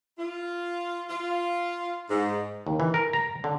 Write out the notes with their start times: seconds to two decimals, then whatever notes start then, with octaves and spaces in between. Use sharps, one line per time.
0.17 F4
1.08 F4
2.08 G#2
2.67 D#2
2.80 E3
2.94 A#4
3.13 A#5
3.44 D3